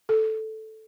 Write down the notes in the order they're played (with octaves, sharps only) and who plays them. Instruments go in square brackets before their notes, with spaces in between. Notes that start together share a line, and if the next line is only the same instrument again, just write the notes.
[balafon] A4